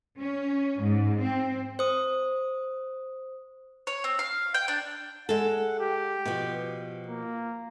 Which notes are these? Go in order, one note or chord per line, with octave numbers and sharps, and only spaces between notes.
C#4
G#2
C4
C5 D#6
C#5
C4
F5
G5
D4
G#3 A4 F#5
G4
B2 F3
A#3